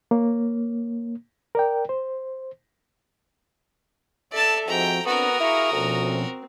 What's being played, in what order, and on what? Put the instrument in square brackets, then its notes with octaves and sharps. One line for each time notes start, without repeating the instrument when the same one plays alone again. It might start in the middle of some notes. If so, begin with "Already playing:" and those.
[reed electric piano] A#3 C#5
A#4 D5 G5
C5
[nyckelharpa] A4 E5 [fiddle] D5 A5
[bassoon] G#2 [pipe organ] F3 C4 F#4 [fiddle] G5 A#5
[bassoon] B3 [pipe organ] C4 D4 [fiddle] F#4 A#4 [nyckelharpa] A#5 D#6
[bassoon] E4 [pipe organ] G#4 F5 C#6
[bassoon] D2 [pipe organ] B2 F3 C#4
[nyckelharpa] C4